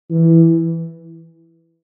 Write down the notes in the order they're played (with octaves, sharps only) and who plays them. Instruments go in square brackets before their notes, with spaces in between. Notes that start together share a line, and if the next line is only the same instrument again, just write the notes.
[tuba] E3